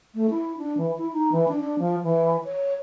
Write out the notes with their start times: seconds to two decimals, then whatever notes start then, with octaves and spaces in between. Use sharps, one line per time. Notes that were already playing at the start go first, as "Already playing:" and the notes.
0.14 A3
0.30 E4
0.58 D4
0.77 E3
0.98 E4
1.13 D#4
1.32 E3
1.48 D4
1.60 D4
1.79 F3
2.04 E3
2.45 C#5